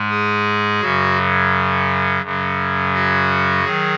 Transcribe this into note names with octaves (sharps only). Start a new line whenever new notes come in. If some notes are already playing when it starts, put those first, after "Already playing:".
Already playing: G#2 G#3
G#4
F#2 C#3 F#3 F#4
F#2 C#3 F#3
F#4
D#3 F#3 G#4